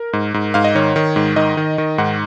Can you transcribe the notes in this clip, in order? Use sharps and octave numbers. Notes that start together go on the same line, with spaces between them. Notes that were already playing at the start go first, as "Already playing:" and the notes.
Already playing: A#4
G#2
G#2
G#2 F5
D#5
D#3 C#5
D#3
G#2
D#3 D#5
D#3
D#3
G#2 F#5